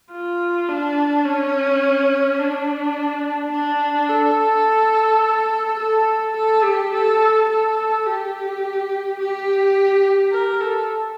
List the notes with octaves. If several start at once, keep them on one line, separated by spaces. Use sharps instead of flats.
F4
D4
C#4
D4
D4
A4
A4
A4
G4
A4
A4
G4
G4
A#4
A4